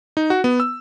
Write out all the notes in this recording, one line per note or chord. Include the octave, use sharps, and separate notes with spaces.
D#4
F#4
B3
E6